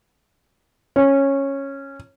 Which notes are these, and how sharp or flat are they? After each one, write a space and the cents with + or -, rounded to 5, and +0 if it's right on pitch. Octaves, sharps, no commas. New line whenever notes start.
C#4 -10